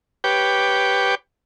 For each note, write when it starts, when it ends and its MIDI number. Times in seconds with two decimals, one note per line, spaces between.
0.24 1.15 67
0.24 1.15 71
0.24 1.15 73
0.24 1.15 79
0.24 1.15 86